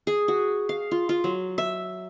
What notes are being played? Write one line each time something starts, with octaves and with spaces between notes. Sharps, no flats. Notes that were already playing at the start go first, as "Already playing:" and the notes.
G#4
F#4
F5
F4
F4
F#3
E5